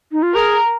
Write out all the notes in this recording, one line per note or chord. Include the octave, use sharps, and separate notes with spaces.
D#4
F4
G#4 A#4